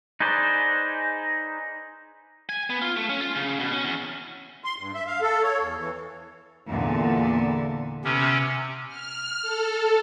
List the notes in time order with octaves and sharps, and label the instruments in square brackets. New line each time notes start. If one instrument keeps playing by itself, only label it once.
[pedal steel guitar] D#4 G#4 B4 C5 D5
[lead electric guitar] G#5
B3
F4
A3
C#4
F4
C#3
B2
C#4
E2
[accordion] C6
G2
E5
F5
A4
C#5
E2
E3
[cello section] E2 A#2 D3
[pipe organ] C3 C#4 [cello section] B3
[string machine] F6
A4